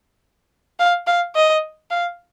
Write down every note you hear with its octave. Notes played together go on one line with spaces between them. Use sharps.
F5
F5
D#5
F5